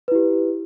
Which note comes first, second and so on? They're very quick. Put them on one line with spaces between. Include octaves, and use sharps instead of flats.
B4 E4 G4